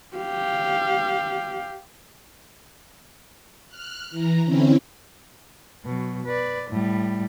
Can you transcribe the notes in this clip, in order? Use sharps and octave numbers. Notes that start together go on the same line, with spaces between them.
G4 F5
F6 F#6
E3 A#5
D3 C4 C#4 E4
B2 F#3
B4 D5
A2 G3